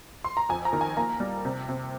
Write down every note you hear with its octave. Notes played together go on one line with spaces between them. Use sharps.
C6
A#5
F2 G#5
A#5
D#3
G#5
A#3 A#5
G3
C3
C3